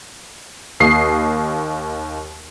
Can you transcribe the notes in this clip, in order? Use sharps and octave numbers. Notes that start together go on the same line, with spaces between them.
D#2 D#6 C7